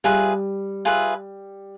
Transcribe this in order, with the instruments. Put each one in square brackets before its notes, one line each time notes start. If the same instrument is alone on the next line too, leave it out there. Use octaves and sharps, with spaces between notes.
[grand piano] G3 [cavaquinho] F4 G#4 B4 E5
[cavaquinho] F4 G#4 B4 E5